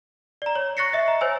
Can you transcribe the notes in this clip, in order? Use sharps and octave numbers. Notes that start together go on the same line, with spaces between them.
D5 A#5
C#5
C#6 F#6 A6 A#6 C7 C#7
D#5 E5
A#5
C5 C#5 G#5 E6